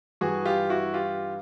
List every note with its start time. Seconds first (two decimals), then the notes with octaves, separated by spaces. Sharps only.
0.21 G2 E3 F#4 G#4
0.45 F4 G4
0.69 E4 F#4
0.93 F4 G4